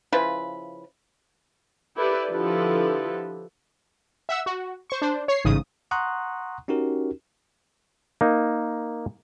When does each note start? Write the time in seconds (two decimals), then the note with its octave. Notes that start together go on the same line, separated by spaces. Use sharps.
0.12 C#3 F3 E4 B4
1.97 E4 G4 A4 B4 D5
2.29 D3 F3 E4 G4 A4 B4
4.29 E5 F#5 E6
4.46 F#4
4.90 C5 C#6
5.02 D4 C5
5.28 C#5 C7
5.44 A1 G#2 C#3 D#6
5.91 F#5 A#5 C6 C#6 D#6 F#6
6.68 C#4 D#4 F#4 G4 A#4
8.21 A#3 D#4